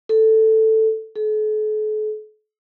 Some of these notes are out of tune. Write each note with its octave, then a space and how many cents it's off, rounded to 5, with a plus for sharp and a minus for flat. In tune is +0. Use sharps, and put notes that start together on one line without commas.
A4 +5
A4 -45